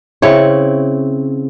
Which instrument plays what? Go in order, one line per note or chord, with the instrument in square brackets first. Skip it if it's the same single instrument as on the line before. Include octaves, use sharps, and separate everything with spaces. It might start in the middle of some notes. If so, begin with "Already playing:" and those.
[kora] C#3 C4 E4 C#5